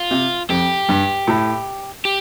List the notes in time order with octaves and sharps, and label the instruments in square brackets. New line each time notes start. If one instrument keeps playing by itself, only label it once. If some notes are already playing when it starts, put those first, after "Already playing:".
Already playing: [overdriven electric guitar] F4
[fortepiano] C3
[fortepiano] F2 [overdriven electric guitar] G4
[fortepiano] G2
A2
[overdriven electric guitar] G4